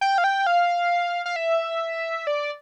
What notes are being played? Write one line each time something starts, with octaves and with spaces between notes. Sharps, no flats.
G5
F5
G5
F5
F5
E5
D5